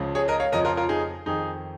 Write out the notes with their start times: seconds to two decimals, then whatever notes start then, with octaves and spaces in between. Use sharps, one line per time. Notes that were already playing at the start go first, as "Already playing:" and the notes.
Already playing: C#2 C#3 F3
0.15 G#4 C#5
0.28 A#4 D#5
0.40 C#5 F5
0.52 F2 C#3 F3 A#4 D#5
0.65 F4 A#4
0.77 F4 A#4
0.89 D#4 G#4
1.26 F2 D#3 D#4 G#4